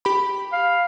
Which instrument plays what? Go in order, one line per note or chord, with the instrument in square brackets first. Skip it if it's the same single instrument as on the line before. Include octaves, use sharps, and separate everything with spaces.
[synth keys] G4 B5
[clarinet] F5